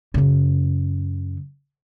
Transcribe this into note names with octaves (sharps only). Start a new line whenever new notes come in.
F#2 C#3